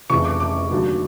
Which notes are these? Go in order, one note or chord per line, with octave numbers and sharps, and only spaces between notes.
F1 F2 C#3 E3 C#6
D6
D6
F1 D#2 D3 F#3